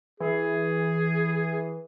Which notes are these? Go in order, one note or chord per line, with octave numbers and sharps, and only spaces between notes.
E3 G#4